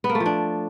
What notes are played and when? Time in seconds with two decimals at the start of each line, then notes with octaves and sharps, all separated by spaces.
0.04 B3
0.09 A#3
0.15 A3
0.20 F3
0.26 D4